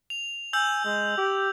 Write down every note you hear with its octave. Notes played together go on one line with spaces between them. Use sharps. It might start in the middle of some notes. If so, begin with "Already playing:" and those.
F7
G#5 E6 G6 F#7
G#3
G4